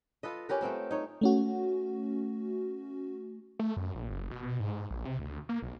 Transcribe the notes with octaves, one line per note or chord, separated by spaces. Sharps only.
F4 A4 B4 D#5
C#4 G4 A#4 B4
A3 B3 C4 A#4
D#4 C#5
A3 C#4 F#4
A3
F#2
A#1
F#1
B2
B2
G#2
A#1
C3
D2
A#3
B1